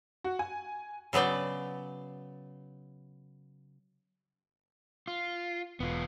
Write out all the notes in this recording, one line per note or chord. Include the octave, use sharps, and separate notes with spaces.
F#4
G#5
C#3 F#3 B3 D5 G5
F4
E1 B3 F4